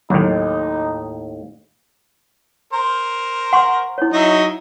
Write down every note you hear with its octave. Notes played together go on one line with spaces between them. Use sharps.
D#2 A2 D#3 F#3 D#4
A#4 C5
F#5 C6 C#6
E4 C#5
F#3 D#4 E5